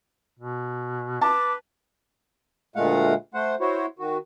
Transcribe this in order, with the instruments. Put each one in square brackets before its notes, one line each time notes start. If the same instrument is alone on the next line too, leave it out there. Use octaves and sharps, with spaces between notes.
[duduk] B2
[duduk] B4 [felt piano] A5 [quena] D6
[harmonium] D2 A#2 G#3 A3 F5 F#5
A3 C5 F#5
E4 F#4 C5 C#5
D#3 F#4